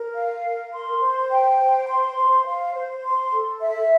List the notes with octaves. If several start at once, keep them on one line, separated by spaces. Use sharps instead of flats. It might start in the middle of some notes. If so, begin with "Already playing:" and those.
Already playing: A#4
F5
A#4
C6
C5
G5
C5
C6
C5
F5
C5
C6
A4
E5